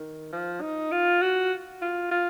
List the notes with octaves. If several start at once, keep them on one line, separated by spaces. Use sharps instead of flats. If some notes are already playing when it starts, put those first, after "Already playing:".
Already playing: D#3
F3
D#4
F4
F#4
F4
F4